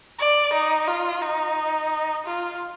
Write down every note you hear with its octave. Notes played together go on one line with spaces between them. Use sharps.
D5
D#4
F4
D#4
F4